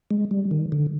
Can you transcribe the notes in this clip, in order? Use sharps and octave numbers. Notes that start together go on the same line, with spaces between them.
G#3
G3
D#3
D3